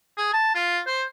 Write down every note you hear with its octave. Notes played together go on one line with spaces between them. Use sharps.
G#4
A5
F4
C5